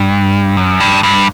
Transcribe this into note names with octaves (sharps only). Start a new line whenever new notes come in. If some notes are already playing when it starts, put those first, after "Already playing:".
Already playing: G2
F#2
G2
G2